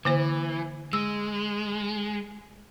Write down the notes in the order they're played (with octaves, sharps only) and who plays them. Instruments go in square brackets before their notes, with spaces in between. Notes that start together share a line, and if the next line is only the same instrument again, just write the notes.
[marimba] D3 A#3 C5 [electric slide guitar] E3
[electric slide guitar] G#3 [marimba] E6